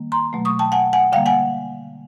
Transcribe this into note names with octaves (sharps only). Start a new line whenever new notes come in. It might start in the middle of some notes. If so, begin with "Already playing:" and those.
Already playing: D#3 G3 A#3
A#5 C6
B2 F#3 A3
C#6 D#6
G5 A5
F#5 G#5
F#5 G#5
D3 G3 A#3 F5 G5
F#5 G#5